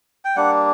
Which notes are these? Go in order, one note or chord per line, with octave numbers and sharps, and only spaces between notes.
G5
G3 A#3 D4 F#5